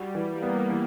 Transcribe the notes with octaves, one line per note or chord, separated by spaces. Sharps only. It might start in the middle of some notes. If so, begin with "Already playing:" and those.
Already playing: G3 F#4
E3
A#3
B3
E3